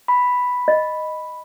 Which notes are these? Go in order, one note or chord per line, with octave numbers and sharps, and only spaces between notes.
B5
D#5